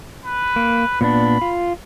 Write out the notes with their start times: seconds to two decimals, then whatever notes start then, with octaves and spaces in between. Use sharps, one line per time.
0.24 B4
0.56 A#3
1.01 A#2 B3 D4 B5
1.41 F4